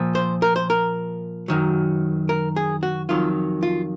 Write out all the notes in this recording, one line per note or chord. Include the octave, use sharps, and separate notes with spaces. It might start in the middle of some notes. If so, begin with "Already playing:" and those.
Already playing: A#2 F3
C5
A#4
C5
A#4
F#2 D#3 F#3
A#4
G#4
F#4
F2 D#3 F#3 F4
F4